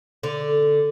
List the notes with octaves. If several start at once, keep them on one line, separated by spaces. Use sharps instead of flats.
D3